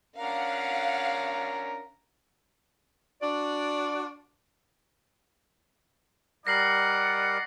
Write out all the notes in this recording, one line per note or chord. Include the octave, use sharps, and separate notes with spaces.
C#4 D4 A#4 F5 F#5
D4 F#4 D5
G3 D#4 A#4 D5 F#5 A#6 C7 F#7